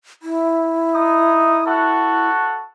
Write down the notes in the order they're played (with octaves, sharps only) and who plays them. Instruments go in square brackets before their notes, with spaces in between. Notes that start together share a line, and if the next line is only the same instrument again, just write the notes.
[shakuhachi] E4
[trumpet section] D#4 D#6
F#4 A4 F#5